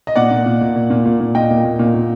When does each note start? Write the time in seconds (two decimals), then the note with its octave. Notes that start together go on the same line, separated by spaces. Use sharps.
0.07 D#5
0.16 A#2 D5 F#5
0.31 A#2
0.46 A#2
0.61 A#2
0.75 A#2
0.90 A#2
1.05 A#2
1.20 A#2
1.35 A#2 D#5 G5
1.50 A#2
1.65 A#2
1.79 A#2
1.94 A#2